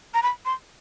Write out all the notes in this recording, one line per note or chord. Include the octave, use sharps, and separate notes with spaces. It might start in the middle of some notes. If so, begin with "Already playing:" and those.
A#5
B5
C6